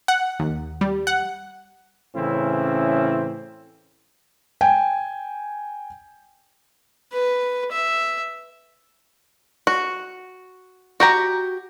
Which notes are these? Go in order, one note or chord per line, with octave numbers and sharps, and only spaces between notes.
F#5
D#2
G3
F#5
A2 C#3 E3 C4 C#4 E4
G5 G#5
B4
E5
F#4
F#4 G4 A#5